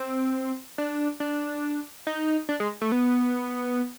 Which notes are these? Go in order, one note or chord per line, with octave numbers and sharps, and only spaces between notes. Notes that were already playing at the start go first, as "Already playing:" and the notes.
Already playing: C4
D4
D4
D#4
D4
G#3
A3
B3